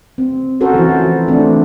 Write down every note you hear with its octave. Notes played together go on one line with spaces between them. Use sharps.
C4
C#4 F#4 A4 A#4 C5
E3 F3 E4
E3 A3 C4 D4